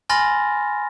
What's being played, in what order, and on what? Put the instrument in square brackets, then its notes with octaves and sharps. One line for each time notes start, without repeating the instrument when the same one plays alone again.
[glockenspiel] G#5 B5 C6 F6 A6 A#6